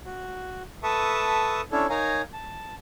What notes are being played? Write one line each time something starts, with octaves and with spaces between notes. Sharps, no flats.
F#4
A4 B4 E5 A5 C#6 D#6
C#4 D4 E4 A4 C#5
D#4 A#4 C#5 F5 G#5 A#5
A5